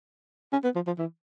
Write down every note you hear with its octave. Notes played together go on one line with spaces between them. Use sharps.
C#4
B3
F3
F3
E3